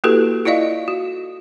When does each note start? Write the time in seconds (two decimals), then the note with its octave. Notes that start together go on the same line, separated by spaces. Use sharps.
0.04 A#3 E4 F#4 G4 A4 B4
0.45 E4 F4 D5 D#5 F5
0.88 F#4